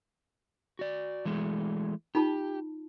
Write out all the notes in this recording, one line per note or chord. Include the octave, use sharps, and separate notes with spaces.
F#4 D5
E3 G#3 A3
D#4 F4 G4 A5